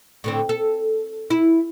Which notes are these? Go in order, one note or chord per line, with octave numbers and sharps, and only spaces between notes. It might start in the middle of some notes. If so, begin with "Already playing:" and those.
A2 D3 C4
A4
E4